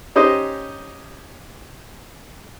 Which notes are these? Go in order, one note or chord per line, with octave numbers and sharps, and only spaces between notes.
C#4 D#4 G4 C5 D#5